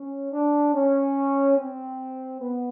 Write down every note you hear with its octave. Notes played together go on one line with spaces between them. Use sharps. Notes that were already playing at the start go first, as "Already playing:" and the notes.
Already playing: C#4
D4
C#4
C4
B3